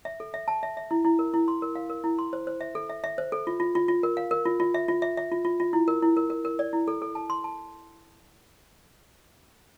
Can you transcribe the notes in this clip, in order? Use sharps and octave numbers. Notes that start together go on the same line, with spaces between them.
E5
A4
E5
A5
E5
E5
E4
E4
A#4
E4
C6
A#4
F5
A#4
E4
C6
C5
C5
E5
A4
E5
E5
C5
A4
F4
F4
F4
F4
A#4
F5
A#4
F4
F4
E5
F4
E5
E5
F4
F4
F4
E4
A#4
E4
A#4
A#4
A#4
D5
E4
A4
A4
A5
C6
A5